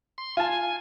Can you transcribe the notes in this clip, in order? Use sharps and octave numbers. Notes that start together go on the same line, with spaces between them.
C6
F4 G#5 A5